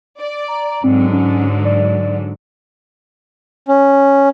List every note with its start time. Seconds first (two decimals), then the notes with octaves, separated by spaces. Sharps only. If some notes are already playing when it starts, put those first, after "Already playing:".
0.19 D5
0.48 A#5
0.84 G#2 D3 F#3 C4
1.12 C#4
1.65 D5
3.68 C#4